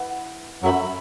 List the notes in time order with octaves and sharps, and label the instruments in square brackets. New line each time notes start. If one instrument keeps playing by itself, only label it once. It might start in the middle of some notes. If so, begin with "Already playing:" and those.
Already playing: [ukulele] E4 B4 F#5
[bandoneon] F#2 F#3 [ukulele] A4 E5 B5